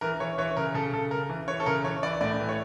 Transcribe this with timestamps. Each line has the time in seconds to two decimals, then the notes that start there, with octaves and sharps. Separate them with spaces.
0.01 E3 A#4
0.20 E3 C#5
0.38 E3 C#5
0.57 C#3 A#4
0.74 C#3 A4
0.93 C#3 A4
1.11 C#3 A#4
1.29 E3
1.48 E3 C#5
1.60 A4
1.66 C#3 A#4
1.84 E3 C#5
2.03 E3 D5
2.21 A2 D5
2.39 E3
2.49 C#5